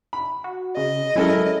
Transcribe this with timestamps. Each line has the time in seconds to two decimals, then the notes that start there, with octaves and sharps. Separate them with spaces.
0.13 B5
0.44 F#4
0.77 C#3 D#5
1.16 F#3 G#3 C#4 E4 A4 A#4